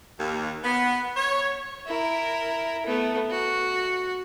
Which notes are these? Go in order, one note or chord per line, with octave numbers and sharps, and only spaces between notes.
D#2
B3
C#5
E4 A#4
A3 B3
F#4